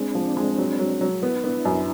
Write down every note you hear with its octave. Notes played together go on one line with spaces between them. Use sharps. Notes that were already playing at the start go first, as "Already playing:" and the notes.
Already playing: G#3 C4 D4
F3
G#3
F#3
F#3
F#3
B3 E4
D#4
B3 D4 E4
F#2